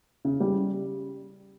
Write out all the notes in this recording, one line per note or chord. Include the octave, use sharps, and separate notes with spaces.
C#3
G3